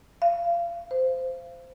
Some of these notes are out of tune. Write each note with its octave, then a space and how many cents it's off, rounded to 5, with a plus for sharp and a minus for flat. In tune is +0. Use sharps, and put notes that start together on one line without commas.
F5 -30
C5 -15